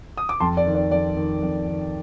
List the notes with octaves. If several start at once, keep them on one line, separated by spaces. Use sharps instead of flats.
D#6
D6
F2 A5 C6
D5
D#3
D5
F2 D5
D#3
F2
D#3